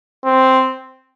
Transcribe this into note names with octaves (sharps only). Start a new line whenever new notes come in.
C4